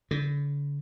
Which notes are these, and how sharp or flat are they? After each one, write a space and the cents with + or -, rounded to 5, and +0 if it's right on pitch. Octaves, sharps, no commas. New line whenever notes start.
D3 -45